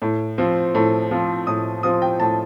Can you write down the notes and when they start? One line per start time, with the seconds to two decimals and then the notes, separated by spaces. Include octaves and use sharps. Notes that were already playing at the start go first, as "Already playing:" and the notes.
0.02 A2
0.38 F3 C4
0.75 A2
1.11 F3 C4
1.47 A2 D#6
1.83 F3 C4 D#6
2.02 G5
2.20 A2 A5